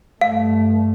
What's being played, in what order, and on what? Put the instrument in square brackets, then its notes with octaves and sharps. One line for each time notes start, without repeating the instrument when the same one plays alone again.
[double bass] G2 A3 [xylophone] F5